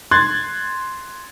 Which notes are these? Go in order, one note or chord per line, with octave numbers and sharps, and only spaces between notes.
C6 F#6 G#6 A6